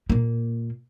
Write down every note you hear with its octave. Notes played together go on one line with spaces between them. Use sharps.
A#2 A#3